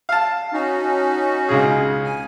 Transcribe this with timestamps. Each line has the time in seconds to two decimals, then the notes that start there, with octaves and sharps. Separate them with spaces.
0.09 F5 A5
0.53 C#4 D#4 F#4
1.49 C#2 C#3 G#4
2.04 G#5